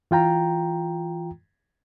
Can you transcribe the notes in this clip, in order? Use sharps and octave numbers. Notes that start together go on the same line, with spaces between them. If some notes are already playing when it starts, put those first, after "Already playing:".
E3 F4 G5 A#5